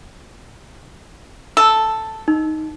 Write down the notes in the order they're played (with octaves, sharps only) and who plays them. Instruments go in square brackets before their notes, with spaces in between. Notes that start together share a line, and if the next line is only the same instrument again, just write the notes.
[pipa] A4 [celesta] A5
[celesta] D#4